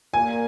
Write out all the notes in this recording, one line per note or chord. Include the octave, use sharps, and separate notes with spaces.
A#2 A#3 G#5